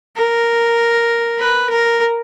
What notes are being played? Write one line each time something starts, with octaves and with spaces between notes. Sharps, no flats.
A#4
B4
A#4